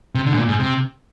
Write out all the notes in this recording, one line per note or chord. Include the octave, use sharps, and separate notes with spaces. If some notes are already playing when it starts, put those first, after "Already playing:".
C3
D3
G#2
A#2
G#2
C3